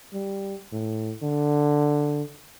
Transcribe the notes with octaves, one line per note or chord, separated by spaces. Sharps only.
G3
A2
D3